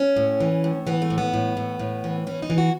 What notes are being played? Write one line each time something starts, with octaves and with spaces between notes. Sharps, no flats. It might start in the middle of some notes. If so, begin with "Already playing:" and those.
Already playing: C#4
A2
E3
A2
E3 B3
A3
A2
B3
A2
A2
A2
E3
E3 C#4
D#4
E3
F#4